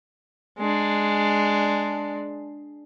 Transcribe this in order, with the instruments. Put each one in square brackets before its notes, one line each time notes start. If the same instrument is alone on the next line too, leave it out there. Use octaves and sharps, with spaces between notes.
[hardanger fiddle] G#3 D4